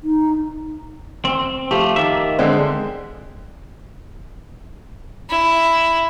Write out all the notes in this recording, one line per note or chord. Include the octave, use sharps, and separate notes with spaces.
D#4
C4
F3 A3 G4
D#3 A#3 E5
D3 G#3 C4
E4